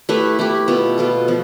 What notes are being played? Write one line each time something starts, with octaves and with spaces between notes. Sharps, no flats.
A3 E4 G4 B4
A3 E4 G4 B4
B2 B3 F4 A4
B2 B3 F4 A4
F3 B3